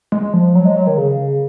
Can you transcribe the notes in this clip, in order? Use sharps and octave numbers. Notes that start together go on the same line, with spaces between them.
G#3
F3
F#3
G#3
F#3
D#3
C#3